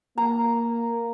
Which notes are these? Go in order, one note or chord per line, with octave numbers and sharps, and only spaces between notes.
A#3 A#5